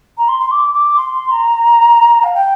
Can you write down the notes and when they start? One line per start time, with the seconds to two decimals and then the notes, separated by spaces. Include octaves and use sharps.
0.17 A#5
0.28 C6
0.39 C6
0.51 D6
0.73 D6
0.96 C6
1.31 A#5
2.23 F5
2.34 G5